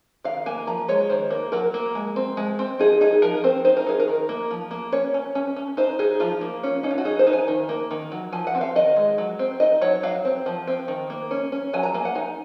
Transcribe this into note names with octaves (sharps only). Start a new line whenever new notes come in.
D#3 F5
A#3 G#5
F3 A#5
G#3 C#5
D#3 C5
A#3
F#3 A#4
A#3
G#3
C4
G#3
C4
D#4 G#4
D#4 G#4
F3 A#4
C4 C5
D#4 C5
A#4
D#4 G#4
A#4
D#3
A#3
F3
A#3
C#4 C#5
C#4
C#4
C#4
D#4 C5
D#4 G#4
F3 F4
A#3
C#4
C#4 D#4
F4
F#4
D#4 G#4
C5
D#4
G#5
D#3
A#3
D#3
F#3
F3 G#5
F#5
C4
F5
D#3 D#5
G#3
F#3
C4
D#4 D#5
F#3 C#5
F#3 F5
C4
F3
C4
D#3
A#3
C#4
C#4
F#3 G#5
A#5
A#3 G#5
F#5
D#4 G#5